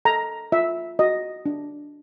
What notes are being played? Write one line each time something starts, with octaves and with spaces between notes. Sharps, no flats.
A4 A#5
F4 E5
F#4 D#5
D4